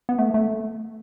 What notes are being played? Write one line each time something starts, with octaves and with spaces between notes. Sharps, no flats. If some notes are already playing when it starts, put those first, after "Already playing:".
B3
A3
A3